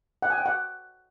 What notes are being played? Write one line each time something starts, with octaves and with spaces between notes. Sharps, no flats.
F#5
G#5
G5
F#5